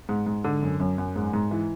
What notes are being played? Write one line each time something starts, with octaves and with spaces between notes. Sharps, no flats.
G#2
G#2
D3
F#2
F#2
F#2
G#2
G#2
E3